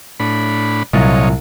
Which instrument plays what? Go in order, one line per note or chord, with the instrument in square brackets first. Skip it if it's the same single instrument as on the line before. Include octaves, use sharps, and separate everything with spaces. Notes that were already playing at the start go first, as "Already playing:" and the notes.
[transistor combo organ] A2 D4 B5
[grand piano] C2 [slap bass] A#2 F#3 [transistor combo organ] F4 C#5 D#5